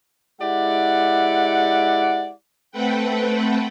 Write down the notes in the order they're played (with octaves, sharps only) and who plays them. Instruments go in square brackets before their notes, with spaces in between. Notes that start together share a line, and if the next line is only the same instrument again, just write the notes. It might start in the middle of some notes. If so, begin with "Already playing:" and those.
[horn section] G#3 E4 G4 D5 F#5
[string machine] A3 C4 A4 B4 F#5 G5